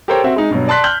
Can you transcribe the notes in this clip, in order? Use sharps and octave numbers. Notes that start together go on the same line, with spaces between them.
G4 A4 A#4 C5 C#5 G5
C4 F#4 E5
G#3 D#4
G2 B2 F#3
D5 A5 C6 F#6 B6
F6 G6 F#7